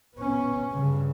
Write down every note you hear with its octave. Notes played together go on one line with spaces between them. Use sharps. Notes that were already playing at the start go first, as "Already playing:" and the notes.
B3 C#4
G2 C#3